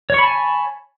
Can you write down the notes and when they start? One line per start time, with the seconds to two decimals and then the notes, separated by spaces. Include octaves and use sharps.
0.10 C#5
0.14 C#6
0.19 B5
0.23 A5
0.27 G#5